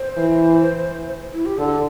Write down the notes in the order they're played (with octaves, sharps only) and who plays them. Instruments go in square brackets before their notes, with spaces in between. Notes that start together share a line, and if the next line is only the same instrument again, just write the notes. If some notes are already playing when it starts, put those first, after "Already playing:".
Already playing: [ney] C5
[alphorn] E3
[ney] E4
G4
[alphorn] D3 [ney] A4